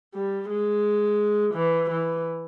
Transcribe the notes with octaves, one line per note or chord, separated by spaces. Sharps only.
G3
G#3
E3
E3